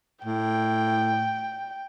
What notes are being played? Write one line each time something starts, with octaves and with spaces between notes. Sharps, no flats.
A2 G5